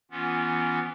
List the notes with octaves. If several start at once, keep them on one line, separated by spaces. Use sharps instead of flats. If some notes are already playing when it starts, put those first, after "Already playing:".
E3 B3 C#4 F4